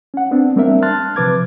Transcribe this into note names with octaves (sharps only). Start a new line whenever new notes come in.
C#4 F#5
B3 C4 D4
G3 A#3 C4 D4 A#4 E5
A5 C6 F6 F#6 A6
C3 F3 B4 D6 G#6